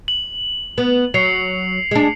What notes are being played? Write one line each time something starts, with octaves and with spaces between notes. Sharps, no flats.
F#7
B3
F#3 C7 C#7 F7
G#3 D4